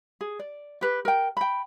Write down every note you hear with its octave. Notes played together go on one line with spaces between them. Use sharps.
G#4
D5
G4 B4
A#4 G5
G5 B5